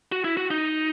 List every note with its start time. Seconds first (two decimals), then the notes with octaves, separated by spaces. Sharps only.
0.12 F#4
0.24 E4
0.37 F#4
0.51 D#4